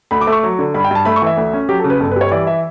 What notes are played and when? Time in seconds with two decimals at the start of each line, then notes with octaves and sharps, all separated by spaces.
0.11 D2 B5
0.21 D6
0.27 A3
0.32 C#6
0.43 F#3
0.59 D3
0.74 G2 B5
0.84 G5
0.91 G2 A5
1.05 A3 B5
1.16 C#6
1.22 E3 E5
1.37 D2
1.53 C#4
1.69 F#3 G4
1.79 A4
1.84 C#3
1.90 B4
2.00 G1 A4
2.11 B4
2.16 G3 C#5
2.31 E3 D5
2.47 E5